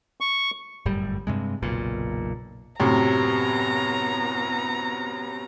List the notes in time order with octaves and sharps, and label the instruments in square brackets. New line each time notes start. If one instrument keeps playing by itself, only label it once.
[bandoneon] C#6
[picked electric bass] G1 F#2 A2 G3
G2 C3 G#3
F#1 B1 A#2
[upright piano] F#2 A2 C3 [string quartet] B3 A#5